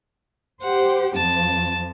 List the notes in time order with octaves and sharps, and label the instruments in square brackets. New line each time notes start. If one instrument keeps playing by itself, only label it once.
[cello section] G4 C5 [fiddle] F#5
[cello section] F2 F3 [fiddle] A5